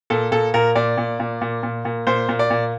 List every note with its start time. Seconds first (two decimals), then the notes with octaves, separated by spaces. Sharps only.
0.10 A#2 A4
0.32 A#2 A4
0.54 A#2 A#4
0.76 A#2 D5
0.98 A#2
1.20 A#2
1.41 A#2
1.63 A#2
1.85 A#2
2.07 A#2 C5
2.29 A#2
2.39 D5
2.50 A#2